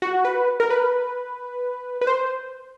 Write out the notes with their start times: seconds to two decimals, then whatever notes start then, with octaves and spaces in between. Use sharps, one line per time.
0.02 F#4
0.25 B4
0.60 A#4
0.70 B4
2.01 B4
2.07 C5